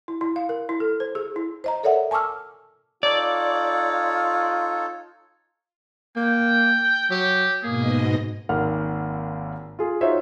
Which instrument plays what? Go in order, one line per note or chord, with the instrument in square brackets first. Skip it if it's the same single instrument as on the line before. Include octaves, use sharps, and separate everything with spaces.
[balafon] E4
E4
F5
A#4
E4
A4
C5
G#4
E4
[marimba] C5 D#5 A#5
A4 A#4 C#5 D5 E5 F#5
G#5 A5 C#6 D6 E6 F6
[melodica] D#4 A4 C#5 [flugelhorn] F4 [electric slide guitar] D5
[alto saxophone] A#3 [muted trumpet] G5
[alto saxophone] F#3 [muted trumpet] G4
[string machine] G#2 B2 D#5 [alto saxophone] A#3 [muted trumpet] G#4
[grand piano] G#1 D#2 F#5 F6
F4 G#4
D#4 F4 F#4 C5 C#5 E5